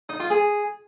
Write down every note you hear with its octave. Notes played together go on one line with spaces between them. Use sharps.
D#4
F4
G#4